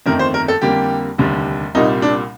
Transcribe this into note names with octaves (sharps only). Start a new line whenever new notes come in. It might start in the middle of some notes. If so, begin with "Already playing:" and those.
G1 F2 D#3 A3 A#4
C5
A#4
A4
F2 D3 G3 A#3 G4
F1 D#2 D3 G3
C2 A#2 G3 A#3 D#4
D4